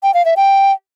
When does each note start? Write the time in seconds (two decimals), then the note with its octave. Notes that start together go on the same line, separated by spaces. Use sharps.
0.03 G5
0.14 F5
0.25 E5
0.37 G5